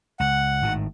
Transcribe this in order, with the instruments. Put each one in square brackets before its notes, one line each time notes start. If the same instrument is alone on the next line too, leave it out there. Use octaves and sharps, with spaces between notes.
[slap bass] C#2 [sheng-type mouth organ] F#5
[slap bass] G#1 A2 D#3